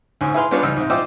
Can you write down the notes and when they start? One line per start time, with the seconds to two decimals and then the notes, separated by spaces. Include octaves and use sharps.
0.21 D2 G#2 C#4
0.34 E4 G#4 B4 F5 C6
0.51 G3 G#3 B3 D4 F4 C#5
0.63 C#2 G3 D#4 E6 F6
0.77 G#2 C3
0.90 D#4 F4 C5 D5 E5 G5